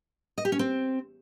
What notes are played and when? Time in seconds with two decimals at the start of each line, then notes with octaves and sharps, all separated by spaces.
0.38 D#5
0.45 G4
0.52 C#4
0.59 C4